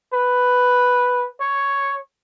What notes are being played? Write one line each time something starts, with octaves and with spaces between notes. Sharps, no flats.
B4
C#5